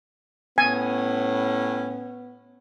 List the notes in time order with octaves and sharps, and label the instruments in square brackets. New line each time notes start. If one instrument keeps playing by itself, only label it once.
[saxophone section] A2 C#4 [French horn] B3 [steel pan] G#5